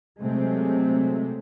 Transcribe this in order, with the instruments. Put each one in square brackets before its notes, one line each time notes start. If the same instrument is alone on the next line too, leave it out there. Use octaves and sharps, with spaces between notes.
[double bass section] C3 F#3 G#3 A3 C4